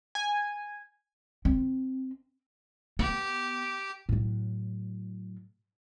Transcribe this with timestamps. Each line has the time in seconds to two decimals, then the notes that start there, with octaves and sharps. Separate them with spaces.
0.15 G#5
1.45 C4
2.99 B3 G4
4.09 A2 F#3